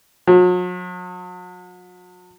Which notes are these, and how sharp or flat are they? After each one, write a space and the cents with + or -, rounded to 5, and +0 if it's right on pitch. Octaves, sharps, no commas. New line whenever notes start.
F#3 -40